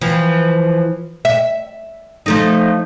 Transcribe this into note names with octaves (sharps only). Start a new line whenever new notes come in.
E3 F3
E5
F3 A3 D#4